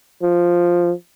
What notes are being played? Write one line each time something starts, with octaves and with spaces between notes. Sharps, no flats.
F3